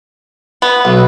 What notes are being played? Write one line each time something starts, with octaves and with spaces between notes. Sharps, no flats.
B3
B1